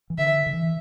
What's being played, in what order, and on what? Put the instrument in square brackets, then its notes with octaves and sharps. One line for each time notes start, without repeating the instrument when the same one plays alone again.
[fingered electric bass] E3
[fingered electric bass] D3 [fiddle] E5
[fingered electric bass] D3
E3